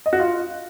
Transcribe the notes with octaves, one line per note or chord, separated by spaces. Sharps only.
D#5
F#4
F4